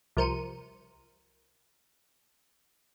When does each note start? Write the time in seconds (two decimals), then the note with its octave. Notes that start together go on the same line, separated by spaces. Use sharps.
0.17 C2 F3 A#4 C5 C#7 D#7